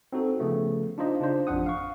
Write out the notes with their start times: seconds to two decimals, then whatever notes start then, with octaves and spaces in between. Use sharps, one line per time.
0.13 C4 D#4 F#4 A4
0.39 C#3 F3 A3 B3
0.98 D4 D#4 F4 C5 D#5
1.20 C#3 D4 D#4 F4 C5
1.47 A1 F2 F3 D4 F#5 D#6
1.66 F5 C#6